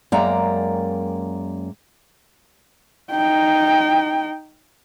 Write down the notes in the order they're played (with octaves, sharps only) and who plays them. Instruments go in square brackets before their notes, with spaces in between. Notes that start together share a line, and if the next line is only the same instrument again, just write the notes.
[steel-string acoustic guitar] F#2 G#3 A#3 D5 G5 A#5
[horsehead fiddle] D#4 G5